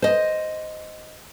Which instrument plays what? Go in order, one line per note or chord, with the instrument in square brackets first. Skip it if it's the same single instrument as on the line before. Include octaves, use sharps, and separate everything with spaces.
[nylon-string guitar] C5 D#5